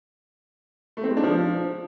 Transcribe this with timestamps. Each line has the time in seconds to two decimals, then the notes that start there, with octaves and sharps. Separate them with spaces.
0.97 A3
1.04 C4
1.10 G#3
1.17 D4
1.23 F3